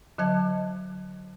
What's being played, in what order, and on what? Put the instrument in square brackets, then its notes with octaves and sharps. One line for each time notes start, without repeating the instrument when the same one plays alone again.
[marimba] D3 F#3 D#5 A5 G#6